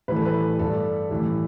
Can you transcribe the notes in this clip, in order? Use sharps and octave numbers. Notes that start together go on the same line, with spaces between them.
A2 E3 G3 B4
A4
B4
G2 G3 A4
A2 E3 G3